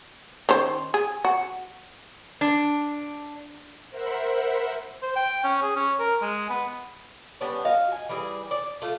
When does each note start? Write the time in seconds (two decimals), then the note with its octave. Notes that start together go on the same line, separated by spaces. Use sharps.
0.49 D#3 C#4 C5
0.94 G#4
1.25 F#4
2.41 D4
3.90 A#4 C5 E5 F#5 B5
5.02 C5
5.16 G5
5.44 C#4
5.62 G#4
5.76 C#4
5.99 A#4
6.22 G#3
6.50 B3
7.41 G3 B3 C#4 D4
7.65 F#4 D#5 F5
7.92 G#5
8.09 E3 G3 G#4 D5
8.51 D5
8.82 A3 F4